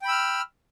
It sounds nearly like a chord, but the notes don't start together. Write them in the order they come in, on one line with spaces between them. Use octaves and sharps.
G5 B5 E6 F6